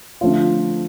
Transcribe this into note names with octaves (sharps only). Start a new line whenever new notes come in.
D3 F3 A3 C4 F4